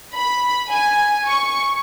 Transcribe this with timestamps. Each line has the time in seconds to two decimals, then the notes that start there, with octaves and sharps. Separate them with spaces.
0.14 B5
0.69 G#5
1.27 C#6